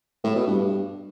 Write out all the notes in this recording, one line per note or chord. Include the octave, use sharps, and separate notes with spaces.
A2
B2
G2
G2